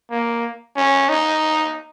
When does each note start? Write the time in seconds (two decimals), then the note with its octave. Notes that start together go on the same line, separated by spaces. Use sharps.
0.11 A#3
0.76 C#4
1.09 D#4